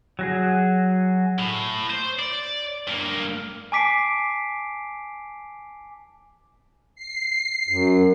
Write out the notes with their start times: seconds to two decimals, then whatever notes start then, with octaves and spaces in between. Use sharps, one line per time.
0.19 F#3 F#4 G#4
1.39 A2
1.90 C5
2.19 D5
2.88 G2 A#3
3.72 G#5 A5 D6 B6 C7 D7
6.95 C7
7.69 F#2